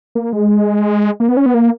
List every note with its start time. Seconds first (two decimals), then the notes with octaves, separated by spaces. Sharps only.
0.15 A#3
0.33 G#3
1.20 A#3
1.29 B3
1.37 C#4
1.46 B3
1.54 A#3